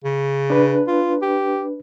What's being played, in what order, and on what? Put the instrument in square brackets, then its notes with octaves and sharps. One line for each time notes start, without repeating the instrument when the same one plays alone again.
[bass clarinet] C#3
[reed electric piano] D4 B4
[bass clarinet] F4
G4